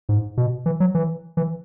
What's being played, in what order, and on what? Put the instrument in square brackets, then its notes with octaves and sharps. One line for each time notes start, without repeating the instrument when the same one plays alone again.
[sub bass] G#2
B2
E3
F#3
E3
E3